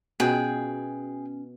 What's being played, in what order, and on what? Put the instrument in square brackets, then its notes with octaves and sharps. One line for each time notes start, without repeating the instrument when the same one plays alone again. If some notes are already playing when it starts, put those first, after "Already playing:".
[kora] B2 B4 [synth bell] B3 F#4 [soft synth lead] C#4 [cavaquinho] G#4 G5